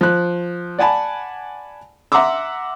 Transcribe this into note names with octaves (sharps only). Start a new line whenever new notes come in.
F3 F#6
D5 F#5 G#5 A5 B5
E5 F#5 A#5 C6 D6 E6